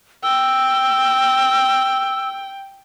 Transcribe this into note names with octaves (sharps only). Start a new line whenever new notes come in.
G5 E6